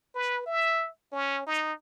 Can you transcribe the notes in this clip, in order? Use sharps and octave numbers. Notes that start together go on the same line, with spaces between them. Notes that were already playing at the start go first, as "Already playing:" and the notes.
B4
E5
C#4
D#4